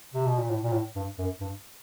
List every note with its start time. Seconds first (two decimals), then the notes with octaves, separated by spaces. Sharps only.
0.14 C3
0.26 B2
0.38 A#2
0.50 A2
0.63 A#2
0.72 A2
0.95 G2
1.18 F#2
1.40 G2